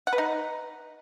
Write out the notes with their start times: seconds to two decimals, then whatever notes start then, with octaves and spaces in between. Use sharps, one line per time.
0.07 F#5
0.13 B4
0.18 D#4